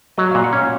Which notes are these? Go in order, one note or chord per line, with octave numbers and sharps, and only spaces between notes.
F#3 D#5
A#2 F5
F#5
C#4
F5